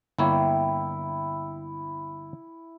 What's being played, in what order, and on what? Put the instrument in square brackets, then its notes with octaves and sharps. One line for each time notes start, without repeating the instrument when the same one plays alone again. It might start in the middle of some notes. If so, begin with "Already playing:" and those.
[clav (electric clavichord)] G1 A#3 C#5 [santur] E4 G5